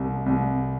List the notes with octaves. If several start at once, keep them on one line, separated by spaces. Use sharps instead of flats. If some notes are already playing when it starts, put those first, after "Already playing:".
Already playing: C2
C2